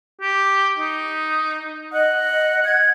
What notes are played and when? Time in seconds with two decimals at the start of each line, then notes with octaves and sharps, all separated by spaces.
0.21 G4
0.79 D#4
1.93 D#5 F#5
2.65 G#6